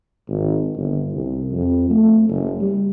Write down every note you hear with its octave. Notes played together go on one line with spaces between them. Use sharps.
G#1
G1
C2
F2
A3
F#1
G3